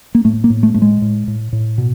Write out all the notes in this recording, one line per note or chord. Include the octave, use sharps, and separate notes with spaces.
A#3
A2 A3
A#3
A2
A3
A2 A3
G#3
A2
A2
A2
B2